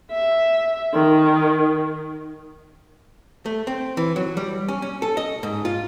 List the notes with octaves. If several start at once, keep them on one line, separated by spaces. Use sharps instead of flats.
E5
D#3
A3
C4
E3
F#3
G3
C#4
C#4
A4
D#5
G#2
F4